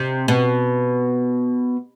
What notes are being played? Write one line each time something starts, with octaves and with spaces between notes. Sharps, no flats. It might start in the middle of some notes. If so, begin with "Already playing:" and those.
Already playing: C3
B2